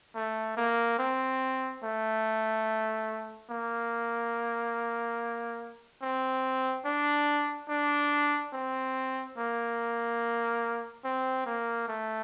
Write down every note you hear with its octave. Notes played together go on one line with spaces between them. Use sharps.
A3
A#3
C4
A3
A#3
C4
D4
D4
C4
A#3
C4
A#3
A3